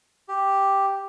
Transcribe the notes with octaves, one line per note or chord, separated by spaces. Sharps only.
G4